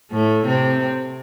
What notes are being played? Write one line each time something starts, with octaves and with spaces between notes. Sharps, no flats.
A2 A3
C3 C4